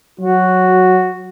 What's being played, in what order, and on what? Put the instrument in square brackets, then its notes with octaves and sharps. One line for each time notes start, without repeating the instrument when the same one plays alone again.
[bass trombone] F#3 [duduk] F#4